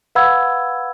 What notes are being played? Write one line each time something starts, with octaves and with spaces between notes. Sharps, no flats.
B4 F5 F#5 B5 E6 G#6